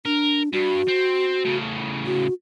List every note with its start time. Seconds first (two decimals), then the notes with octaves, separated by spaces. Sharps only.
0.06 D4 A#4
0.53 G2 F#4
0.88 C4
1.45 A2 C#3
2.06 F#4